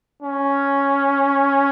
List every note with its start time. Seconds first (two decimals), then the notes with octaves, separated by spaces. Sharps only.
0.22 C#4